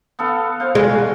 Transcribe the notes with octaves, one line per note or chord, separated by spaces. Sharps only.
B3 A4 F5
C5 F5
G#3
F#4 C6